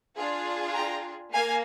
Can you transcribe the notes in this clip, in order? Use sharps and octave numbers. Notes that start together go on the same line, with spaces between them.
D4 F4 G#4
G5 A#5
A#3 F5 G#5